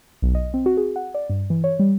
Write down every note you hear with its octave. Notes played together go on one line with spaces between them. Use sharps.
B1
D#5
C4
F#4
G#4
F#5
D5
G2
E3
C#5
G3